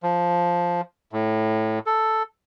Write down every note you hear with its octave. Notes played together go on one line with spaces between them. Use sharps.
F3
A2
A4